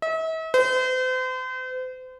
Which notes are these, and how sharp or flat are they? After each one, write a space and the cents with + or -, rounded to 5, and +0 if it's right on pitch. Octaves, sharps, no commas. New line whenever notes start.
E5 -45
C5 -40